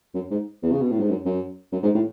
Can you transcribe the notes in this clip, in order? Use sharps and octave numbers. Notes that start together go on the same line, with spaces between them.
F#2
G#2
E2
C#3
B2
A2
G#2
F#2
F#2
F#2
G#2
A2